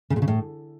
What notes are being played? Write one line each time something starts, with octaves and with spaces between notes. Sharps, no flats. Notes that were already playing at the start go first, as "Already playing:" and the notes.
C#3
A#2
C#3
A2